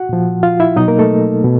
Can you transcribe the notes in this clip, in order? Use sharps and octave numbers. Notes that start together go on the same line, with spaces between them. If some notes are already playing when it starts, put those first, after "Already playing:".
Already playing: F#4 F#5
A#2 F3
F4 F5
E4 E5
B2 F#3 D#4 D#5
A#3 A#4
A3 A4
B2